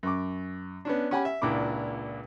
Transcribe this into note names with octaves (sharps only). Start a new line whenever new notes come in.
F#2 C#6 D6
B3 C#4 D4
C#4 G4 F#5 G#5 B5
E5
C#2 A#2 D4 E4 D6